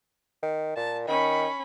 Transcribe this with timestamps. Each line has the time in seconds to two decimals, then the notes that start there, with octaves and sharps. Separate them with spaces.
0.43 D#3
0.76 A#2 A5
1.08 D#3 C#4 B5